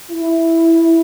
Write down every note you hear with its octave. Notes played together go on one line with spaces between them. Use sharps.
E4